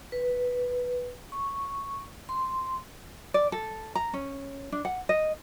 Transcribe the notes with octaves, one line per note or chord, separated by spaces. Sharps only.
B4
C#6
C6
D5
A4
A#5
C#4
D4
F#5
D#5